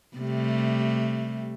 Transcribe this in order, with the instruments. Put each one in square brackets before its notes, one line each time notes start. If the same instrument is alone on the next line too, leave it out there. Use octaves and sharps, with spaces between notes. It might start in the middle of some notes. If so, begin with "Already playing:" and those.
[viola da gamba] C3 G3 A3